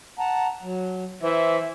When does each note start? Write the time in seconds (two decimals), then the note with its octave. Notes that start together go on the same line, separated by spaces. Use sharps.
0.19 F#5 A5 A#5
0.62 F#3
1.23 E3 C5 E5